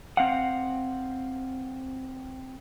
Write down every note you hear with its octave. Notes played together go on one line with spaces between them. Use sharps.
C4 F5 F#5